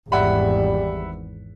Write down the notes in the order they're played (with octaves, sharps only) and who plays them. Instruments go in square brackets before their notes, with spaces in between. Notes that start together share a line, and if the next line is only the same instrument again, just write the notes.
[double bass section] G#1 E2 [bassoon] G3 [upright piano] E5 F#5 B5